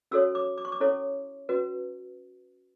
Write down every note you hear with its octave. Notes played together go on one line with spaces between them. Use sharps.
C#4 F#4 A4 C#5 E6
D6
D6
C#6
D6
C#4 E4 A4 C#5
C#4 F#4 B4